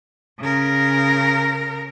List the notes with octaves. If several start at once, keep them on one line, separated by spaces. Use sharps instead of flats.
C#3 A#4